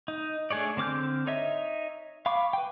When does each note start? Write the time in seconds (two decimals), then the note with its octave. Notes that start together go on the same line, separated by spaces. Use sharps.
0.08 D#4
0.51 A3 D4 G#4 C#5 D5
0.77 D3 C4 D6 F6 G6
1.27 D#4 C#5 D#5 E5
2.26 F5 B5 C#6 D6
2.53 B4 G5